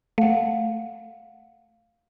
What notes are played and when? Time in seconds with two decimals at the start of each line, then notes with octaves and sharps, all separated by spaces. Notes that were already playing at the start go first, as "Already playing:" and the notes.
0.18 A3 F5 F#5